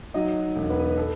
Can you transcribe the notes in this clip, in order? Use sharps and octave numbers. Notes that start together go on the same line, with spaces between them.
F#3 D#4 D#5
E1
B3 B4
A4